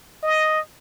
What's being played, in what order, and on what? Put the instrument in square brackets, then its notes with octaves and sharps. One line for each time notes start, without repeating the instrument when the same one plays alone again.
[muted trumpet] D#5